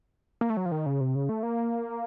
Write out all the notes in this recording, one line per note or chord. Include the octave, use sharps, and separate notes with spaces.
A#3
A3
F#3
F3
D#3
C#3
C3
C#3
A3
A#3